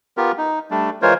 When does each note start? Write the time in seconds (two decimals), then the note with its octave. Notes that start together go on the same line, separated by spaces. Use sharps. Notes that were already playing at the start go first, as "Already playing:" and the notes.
0.17 B3 F4 G4 A#4
0.38 D#4
0.71 G3 A3 D4
1.02 E3 G#3 F4 A#4 C5 C#5